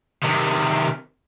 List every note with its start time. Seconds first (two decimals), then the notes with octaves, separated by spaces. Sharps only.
0.23 C3 D#3